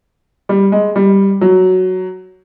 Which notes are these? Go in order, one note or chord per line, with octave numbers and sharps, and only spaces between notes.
G3
G#3
G3
F#3